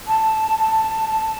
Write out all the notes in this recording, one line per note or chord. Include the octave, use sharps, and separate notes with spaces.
A5
A5
A5